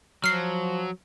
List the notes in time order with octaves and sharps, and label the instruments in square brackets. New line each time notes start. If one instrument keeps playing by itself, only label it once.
[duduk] F3 [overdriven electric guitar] F#3 [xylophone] F6 C7